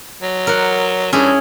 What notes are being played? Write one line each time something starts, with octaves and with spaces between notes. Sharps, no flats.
F#3
A#4 F#5
G2 C#4 E4 G#4